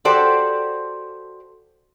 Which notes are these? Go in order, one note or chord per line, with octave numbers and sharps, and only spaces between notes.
F#4 G4 A4 C5 D5